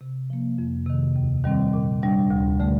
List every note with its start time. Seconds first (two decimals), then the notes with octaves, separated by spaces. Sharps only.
0.01 C3
0.30 F3 A#3
0.58 F2
0.87 C3 D#3
1.16 D#2
1.44 D#3 G3 C4
1.73 A#2
2.02 G3 D4
2.31 D2
2.60 D3 A3